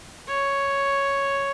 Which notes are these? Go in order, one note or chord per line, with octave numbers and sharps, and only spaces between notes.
C#5